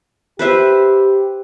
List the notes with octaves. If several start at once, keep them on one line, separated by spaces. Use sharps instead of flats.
G4 B4 C5 E5